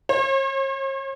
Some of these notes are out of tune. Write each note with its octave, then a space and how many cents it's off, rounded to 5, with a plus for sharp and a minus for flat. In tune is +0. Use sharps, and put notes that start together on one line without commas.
C#5 -40